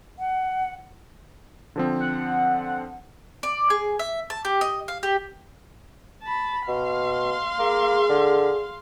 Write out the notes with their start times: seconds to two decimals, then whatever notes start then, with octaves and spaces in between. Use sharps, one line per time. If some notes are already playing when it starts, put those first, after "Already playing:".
0.19 F#5
1.76 D3 F3 C4
2.00 F#5
3.43 D5
3.70 G#4
3.99 E5
4.30 A5
4.45 G4
4.61 D#5
4.88 F5
5.03 G4
6.22 A5 B5
6.68 B2 F5 C6
7.59 A#3 G#4
8.10 D3